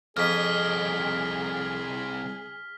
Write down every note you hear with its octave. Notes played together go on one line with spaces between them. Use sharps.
C2 F2 G#4 D#5 F6 B6